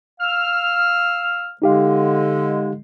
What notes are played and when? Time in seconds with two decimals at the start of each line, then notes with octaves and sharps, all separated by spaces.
0.20 F5 E6 F6
1.62 D3 G#3 D#4 G4 F5